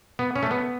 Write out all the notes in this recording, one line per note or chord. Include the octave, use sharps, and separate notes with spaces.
B3
C#4
A3
B3